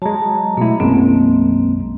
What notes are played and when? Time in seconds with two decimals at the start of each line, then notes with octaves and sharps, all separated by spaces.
0.02 F#3 G#3 A5 A#5
0.57 B2 A3 E4
0.80 B1 F#2 G#3 A#3 C4